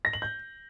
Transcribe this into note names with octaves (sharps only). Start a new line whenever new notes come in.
A#6
F#7
G6